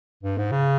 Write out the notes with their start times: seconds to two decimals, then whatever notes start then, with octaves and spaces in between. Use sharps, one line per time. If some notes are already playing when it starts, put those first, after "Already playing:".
0.23 G2
0.38 G#2
0.52 C#3